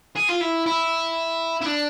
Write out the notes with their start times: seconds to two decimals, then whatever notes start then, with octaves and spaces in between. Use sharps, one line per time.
0.16 G#4
0.29 F4
0.41 E4
0.66 E4
1.62 E4
1.66 D4